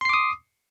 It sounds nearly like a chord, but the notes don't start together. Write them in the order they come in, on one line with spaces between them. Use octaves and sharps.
C6 C7 D6 D#6